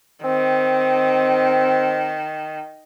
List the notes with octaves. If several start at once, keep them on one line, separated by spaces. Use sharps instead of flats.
D#3 C4